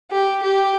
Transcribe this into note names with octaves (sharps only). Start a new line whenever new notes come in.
G4
G4